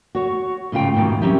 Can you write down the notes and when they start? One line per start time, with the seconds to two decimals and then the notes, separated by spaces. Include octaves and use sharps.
0.15 F#4 C#5
0.72 G#2 C#3 A3 F4 G5
0.94 E2 G#2 B2 D#3
1.21 G3 C4 C#4 E4 G4 A#4